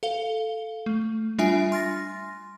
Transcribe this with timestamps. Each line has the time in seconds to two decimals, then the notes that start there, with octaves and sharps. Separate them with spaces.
0.03 A4 F5 G7
0.86 A3
1.38 G3 D4 F4 E5 G#5 D7
1.72 C6 F6 A6 A#6